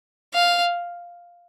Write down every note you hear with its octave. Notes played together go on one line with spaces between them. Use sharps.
F5